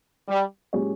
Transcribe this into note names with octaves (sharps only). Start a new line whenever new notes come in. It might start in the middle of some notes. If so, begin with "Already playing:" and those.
G3
A#2 G#3 C#4 G4 C#5